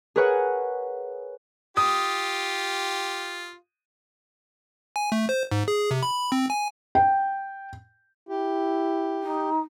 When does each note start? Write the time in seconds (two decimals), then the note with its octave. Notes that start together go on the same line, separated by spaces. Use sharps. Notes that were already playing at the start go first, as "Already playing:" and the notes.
0.16 G#4 A#4 B4 C#5 F#5
1.77 F4 G4 D#6
4.96 G#5
5.12 A3
5.29 C5
5.51 G#2
5.68 G#4
5.91 C3
6.03 B5
6.32 C4
6.50 G#5
6.95 G5
8.29 E4 G4
9.23 D#4